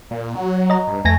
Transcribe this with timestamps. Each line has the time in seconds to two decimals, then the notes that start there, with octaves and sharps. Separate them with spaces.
0.11 A#2
0.35 F#3
0.70 D#5 A#5
0.88 G2
1.05 F2 A3 G#5 A#6